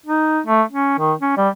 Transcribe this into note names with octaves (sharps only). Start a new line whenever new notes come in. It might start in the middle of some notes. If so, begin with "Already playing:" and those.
D#4
A3
C#4
D#3
C#4
G3